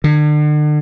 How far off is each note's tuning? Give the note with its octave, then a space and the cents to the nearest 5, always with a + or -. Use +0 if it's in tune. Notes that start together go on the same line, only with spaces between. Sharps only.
D3 +40